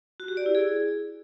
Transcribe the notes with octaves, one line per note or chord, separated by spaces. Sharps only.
F#4
G4
D5
E4
G#4